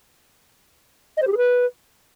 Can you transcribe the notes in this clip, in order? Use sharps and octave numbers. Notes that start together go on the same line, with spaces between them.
D#5
C5
G4
G#4
B4